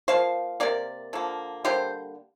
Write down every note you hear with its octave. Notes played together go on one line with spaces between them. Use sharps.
F3 A#3 C5 F5
C3 A#3 A#4 D5
D3 F3 A#3
D3 G3 A#3 G4 C5